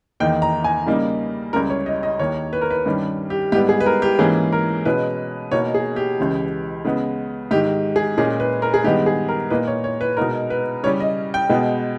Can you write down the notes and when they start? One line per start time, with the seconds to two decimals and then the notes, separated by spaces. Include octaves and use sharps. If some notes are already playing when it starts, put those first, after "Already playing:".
0.20 E2 D#3 A#3 D#4 G5
0.42 A#5
0.64 G#5
0.86 C#3 G3 A#3 D#4
1.53 C#2 C#3 G3 A#4
1.70 C#5
1.86 D#5
2.03 D#5
2.19 D#2 D#3 A#3 D#4 C#5
2.53 B4
2.61 A#4
2.70 B4
2.86 G2 D#3 G3 C#4
3.30 G4
3.52 G#2 G3 B3 G4
3.69 G#4
3.80 B4
3.86 A#4
4.02 G4
4.19 G#2 E3 A#3 C#4 G#4
4.52 A#4
4.85 B2 G#3 C#4 B4
5.52 B2 A#3 D#4 C#5
5.74 G#4
5.96 G4
6.18 C#2 C#3 E3
6.85 C#3 G#3 B3
7.51 G#2 D#3 G#3 G4
7.96 G#4
8.17 A#2 G#3 C#4 G#4
8.40 B4
8.62 A#4
8.74 G#4
8.84 G2 D#3 G#3 B3 G4
9.06 G#4
9.29 A#4
9.50 A#2 A#3 D#4 B4
9.67 C#5
9.84 C#5
10.01 B4
10.17 B2 G#3 B3 D#4 A#4
10.50 B4
10.83 C#3 G3 C#4 C#5
11.00 D#5
11.34 G5
11.49 B2 G#3 B3